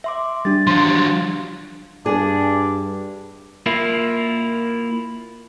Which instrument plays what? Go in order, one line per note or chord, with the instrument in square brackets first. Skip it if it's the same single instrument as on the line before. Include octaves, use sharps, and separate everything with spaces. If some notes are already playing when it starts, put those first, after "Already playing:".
[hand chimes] E5 C6 D6
[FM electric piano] G3 G4 [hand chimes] D4 A6
[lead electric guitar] F3 F#3 [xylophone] C6
[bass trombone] G2 [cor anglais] D4 [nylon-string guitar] G#4
[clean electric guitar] A#3 E4 F4